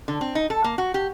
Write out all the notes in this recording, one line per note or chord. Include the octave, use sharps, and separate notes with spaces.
D3
C4
D#4
A4
A#3
F#4
G4